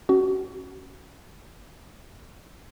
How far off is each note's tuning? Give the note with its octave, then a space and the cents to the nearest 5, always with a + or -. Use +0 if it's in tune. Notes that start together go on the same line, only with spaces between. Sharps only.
C#4 +5 F#4 +25